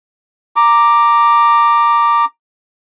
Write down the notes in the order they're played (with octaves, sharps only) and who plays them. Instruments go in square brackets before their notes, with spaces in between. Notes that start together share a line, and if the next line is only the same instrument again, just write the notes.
[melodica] A#5 D6